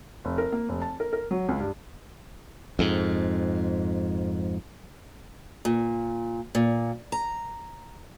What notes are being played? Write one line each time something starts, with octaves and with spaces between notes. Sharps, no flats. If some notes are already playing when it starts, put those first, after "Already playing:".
F1
A#4
A#3
F1
A5
A#4
A#4
F#3
C#2
G2
F2 G#2
A#2
A#2
A#5